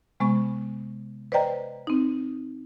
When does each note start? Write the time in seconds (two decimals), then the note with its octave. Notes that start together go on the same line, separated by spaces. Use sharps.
0.20 C3 G#3 B3 C#6
1.32 B4 C5 D5 D#5 G5 A#5
1.87 C4 D#4